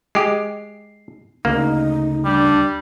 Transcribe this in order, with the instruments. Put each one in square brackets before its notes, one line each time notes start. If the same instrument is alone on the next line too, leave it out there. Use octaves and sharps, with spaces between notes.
[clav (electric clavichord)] G#3 G4 [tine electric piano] C7
[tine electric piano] D2 C#3 [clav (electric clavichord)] A#3 [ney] D#4
[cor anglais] G3 [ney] D4